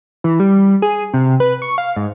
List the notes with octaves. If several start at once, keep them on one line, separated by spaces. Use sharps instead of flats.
E3
G3
G#4
C3
B4
C#6
F5
G#2